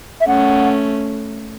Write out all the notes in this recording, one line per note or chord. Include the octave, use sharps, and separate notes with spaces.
E5
A3 C#4 F#5